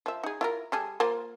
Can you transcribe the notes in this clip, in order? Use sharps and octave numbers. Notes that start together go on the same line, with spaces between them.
F3 E5
D#4 G#4
E4 F4 A#4
G3 G#4 A4
A#3 F4 C5